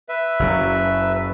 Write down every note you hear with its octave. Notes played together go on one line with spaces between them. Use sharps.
B4 E5
F#1 C#3 F#3